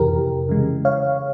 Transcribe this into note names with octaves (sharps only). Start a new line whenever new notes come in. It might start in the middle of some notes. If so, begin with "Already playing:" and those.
Already playing: F2 C3 E3 G4 A#4
C#3 E3 G#3
C#5 F5